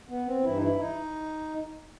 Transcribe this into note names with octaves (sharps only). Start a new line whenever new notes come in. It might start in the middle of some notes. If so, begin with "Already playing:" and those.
B3
C4
G2 E3 E4
D#4
E4
D#4